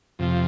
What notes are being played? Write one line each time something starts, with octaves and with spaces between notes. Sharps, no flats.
F2 C3 F3